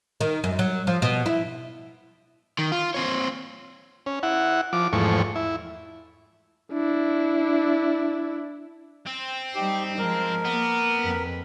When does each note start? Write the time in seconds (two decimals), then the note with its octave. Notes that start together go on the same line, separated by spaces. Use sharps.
0.21 D#3
0.44 F#2
0.59 F#3
0.87 F3
1.02 B2
1.26 E4
2.59 D#3
2.72 F4
2.94 C4 C#5
4.06 C#4
4.23 E4 F#5
4.73 F3 D6
4.93 E2 G#2 F3 A3 C#6
5.36 E4
6.73 D4 E4
9.07 C4
9.55 G3 D#4 G4
9.98 F3 G#3 A#4
10.45 A#3 B3
11.02 F2 B4